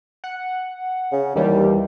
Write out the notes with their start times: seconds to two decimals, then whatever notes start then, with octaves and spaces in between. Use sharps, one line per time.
0.24 F#5
1.12 C#3
1.36 D#2 E3 G3